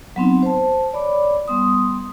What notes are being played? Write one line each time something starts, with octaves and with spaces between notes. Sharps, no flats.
F#3 B3 C4 D#4
C5 A5
C#5 D5 B5 D6
G3 B3 C6 D#6